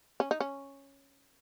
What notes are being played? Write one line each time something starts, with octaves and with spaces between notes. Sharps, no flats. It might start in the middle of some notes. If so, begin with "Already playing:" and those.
C#4
D#4
C#4